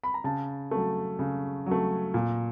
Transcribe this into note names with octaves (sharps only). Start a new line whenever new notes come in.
B5
A#5
C#3 A5
F#3 A3
C#3
F#3
A3
A#2